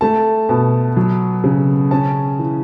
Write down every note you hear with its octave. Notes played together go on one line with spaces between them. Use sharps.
A3 A5
B2
F#3
C#3
C#4 A5
E3